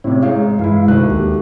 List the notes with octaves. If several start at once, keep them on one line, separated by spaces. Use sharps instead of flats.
A2 C3 C#4 C#5
G#2 G#4 C#5 F5
G2 E3 G#3 E4 F5
D2 C3 D#3 F#6
D#2 A#3 G4